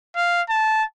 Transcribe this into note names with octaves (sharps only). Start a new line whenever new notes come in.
F5
A5